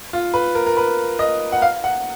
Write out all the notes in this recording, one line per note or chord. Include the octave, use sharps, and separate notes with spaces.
F4
B4
A#4
A#4
B4
D#5
F#5
F5
F#5